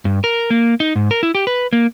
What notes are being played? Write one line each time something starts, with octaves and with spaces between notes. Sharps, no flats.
G2
A#4
A#3
D#4
G#2
A#4
E4
G4
B4
A#3